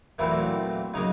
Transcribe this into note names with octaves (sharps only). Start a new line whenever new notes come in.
A#2 E3 F#3 A3 C4 E4
C#3 F#3 A#3 D#4